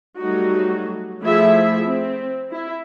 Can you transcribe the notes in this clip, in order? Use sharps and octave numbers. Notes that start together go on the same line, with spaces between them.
F#3 G3 A3 D#4 F#4
F3 A3 E4 G#4 E5
C4
E4 E5